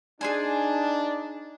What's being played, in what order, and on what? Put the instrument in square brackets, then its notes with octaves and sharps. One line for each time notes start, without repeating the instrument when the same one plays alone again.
[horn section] D4 [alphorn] D#4 [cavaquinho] G#4 C5 G#5